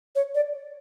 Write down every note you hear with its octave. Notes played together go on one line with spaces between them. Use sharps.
C#5
D5